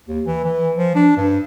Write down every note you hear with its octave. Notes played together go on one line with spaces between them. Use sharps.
D#2
E3
E3
F3
D4
G2